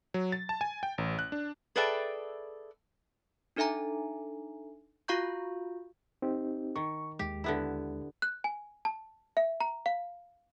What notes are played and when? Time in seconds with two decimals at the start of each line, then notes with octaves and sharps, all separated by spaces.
0.14 F#3
0.32 A6
0.49 A5
0.61 G#5
0.83 G5
0.98 A1
1.19 F#6
1.32 D4
1.76 G#4 A4 B4 D5 E5 G5
3.56 D4 D#4 A4 E5 G#5 A#5
5.08 F4 F#4 F5 A#5 C#6 G6
6.22 C4 D#4 G4
6.76 D#3 C#6
7.19 D#2 G#3 G4
7.44 D3 B3 E4
8.22 F#6
8.44 G#5
8.85 A5
9.37 E5
9.60 A#5
9.86 F5